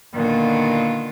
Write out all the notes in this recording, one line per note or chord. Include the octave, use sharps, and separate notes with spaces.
A#2 D3 D#3 B3 F4 F#4